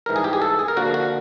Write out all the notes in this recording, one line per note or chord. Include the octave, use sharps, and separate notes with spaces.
G#2 E3 G3 A#4
G#4
G4
G#4
A4
G#4
A#4
D3 F3 A#3 F#4
F#4